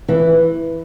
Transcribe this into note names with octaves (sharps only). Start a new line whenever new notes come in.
E3